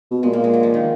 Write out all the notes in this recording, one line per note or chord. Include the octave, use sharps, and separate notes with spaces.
B2
A#2 G#3
A#3
G#3
F#3
F3
D#3